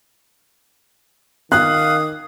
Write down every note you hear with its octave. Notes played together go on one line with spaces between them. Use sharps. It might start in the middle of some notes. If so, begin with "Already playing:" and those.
D#3 F5 D#6 F#6